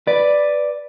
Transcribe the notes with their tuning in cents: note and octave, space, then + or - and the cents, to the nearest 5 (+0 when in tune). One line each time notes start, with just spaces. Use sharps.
B4 +0 D5 +0